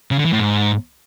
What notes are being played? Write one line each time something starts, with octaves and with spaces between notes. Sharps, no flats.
C#3
D3
E3
A2
G#2